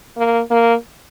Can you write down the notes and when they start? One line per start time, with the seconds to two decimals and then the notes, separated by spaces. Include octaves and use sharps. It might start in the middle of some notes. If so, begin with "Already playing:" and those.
0.17 A#3
0.50 A#3